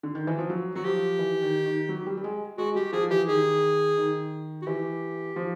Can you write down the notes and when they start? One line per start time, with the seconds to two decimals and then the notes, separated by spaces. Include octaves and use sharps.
0.03 D3
0.15 D#3
0.27 E3
0.38 F3
0.50 F#3
0.75 F#3 F#4
0.84 F3 G4
1.19 E3
1.42 D#3
1.66 D#3
1.89 F#3
2.06 G3
2.17 G3
2.24 G#3
2.58 G#3 F#4
2.75 G3 G4
2.93 F3 G#4
3.10 E3 G4
3.27 D#3 G#4
3.97 D#3
4.62 F#4
4.66 E3 G4
5.36 F3